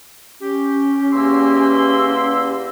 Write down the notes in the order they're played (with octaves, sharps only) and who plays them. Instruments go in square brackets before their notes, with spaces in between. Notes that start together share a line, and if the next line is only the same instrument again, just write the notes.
[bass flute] C#4 [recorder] G4
[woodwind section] E2 A#3 E6 [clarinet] C6